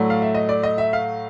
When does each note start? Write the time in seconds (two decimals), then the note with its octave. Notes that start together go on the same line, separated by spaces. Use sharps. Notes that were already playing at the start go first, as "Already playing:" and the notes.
Already playing: A2 F#3 A3 D5
0.10 F5
0.22 E5
0.35 D#5
0.49 D5
0.63 D#5
0.78 E5
0.93 F5